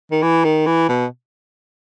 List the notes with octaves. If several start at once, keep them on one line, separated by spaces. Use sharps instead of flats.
D#3
E3
D#3
E3
B2